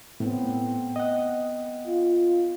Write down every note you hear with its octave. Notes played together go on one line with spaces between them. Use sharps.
A2 B3 C4
D#5 F#5
F4